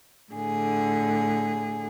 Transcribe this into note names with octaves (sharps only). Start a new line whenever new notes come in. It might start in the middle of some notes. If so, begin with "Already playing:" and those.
A2 D3 G#4